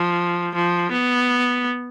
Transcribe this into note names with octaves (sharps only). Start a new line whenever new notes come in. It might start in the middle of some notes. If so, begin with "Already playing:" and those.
Already playing: F3
F3
B3